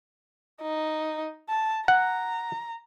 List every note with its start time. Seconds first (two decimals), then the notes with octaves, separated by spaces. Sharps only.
0.62 D#4
1.49 A5
1.88 F#5 A#5